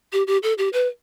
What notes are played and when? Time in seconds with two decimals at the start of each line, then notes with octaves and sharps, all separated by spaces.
0.13 G4
0.27 G4
0.43 A4
0.58 G4
0.73 B4